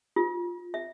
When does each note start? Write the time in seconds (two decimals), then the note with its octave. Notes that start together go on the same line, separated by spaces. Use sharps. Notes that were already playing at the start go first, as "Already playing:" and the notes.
0.16 F4
0.74 E5